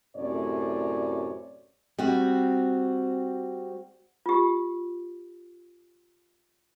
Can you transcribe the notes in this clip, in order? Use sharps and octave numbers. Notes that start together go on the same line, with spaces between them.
F#2 A2 C3 C#5 D5
G3 C4 F#4
F4 G4